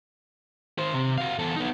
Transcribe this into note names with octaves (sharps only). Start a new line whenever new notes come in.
D#3 C5
C3
F#4 F5
E2 A4
B3 D#4